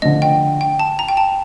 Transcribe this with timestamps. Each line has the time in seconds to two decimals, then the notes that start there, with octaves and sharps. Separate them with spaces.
0.02 D3 F3 A3 D#5
0.22 G5
0.61 G5
0.79 A5
0.99 A#5
1.08 G5
1.17 A5